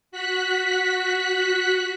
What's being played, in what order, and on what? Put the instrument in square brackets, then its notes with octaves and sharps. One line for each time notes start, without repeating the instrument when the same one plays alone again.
[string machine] F#4 F#6 B6